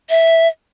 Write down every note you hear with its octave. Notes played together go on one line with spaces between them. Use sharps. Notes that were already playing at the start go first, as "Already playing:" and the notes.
E5